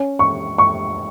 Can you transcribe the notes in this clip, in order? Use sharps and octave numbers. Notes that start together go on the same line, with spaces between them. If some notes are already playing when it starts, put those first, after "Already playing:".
Already playing: C#4
C#6
C#6